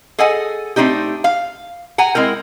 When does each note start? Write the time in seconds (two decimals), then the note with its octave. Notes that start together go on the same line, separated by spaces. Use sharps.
0.19 G#4 A4 D#5 F#5 G#5
0.76 A3 C4 D4 D#4 G4
1.24 F5
1.98 F#5 G#5 A#5
2.15 G#3 C4 E4 A#4